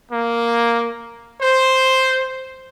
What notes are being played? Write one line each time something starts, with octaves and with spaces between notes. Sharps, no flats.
A#3
C5